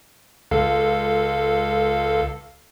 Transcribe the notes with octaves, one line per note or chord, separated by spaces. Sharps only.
C#2 A4 F5